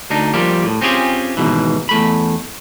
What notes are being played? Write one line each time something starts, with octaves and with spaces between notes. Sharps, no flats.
D2 D4 D#4
F3 G3 A#3 G4
A2
C4 C#4 F4 G4 G#4
D#2 G#2 B2 E3
E2 A3 B5